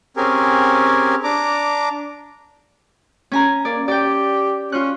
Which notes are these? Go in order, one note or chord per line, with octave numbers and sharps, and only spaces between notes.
C4 C#4 G4 G#4 A#4 G#5
D4 A#5 D6
C#4 G#5 A#5
A#3 D5
G4 D5 G5
C#4 F4 F#6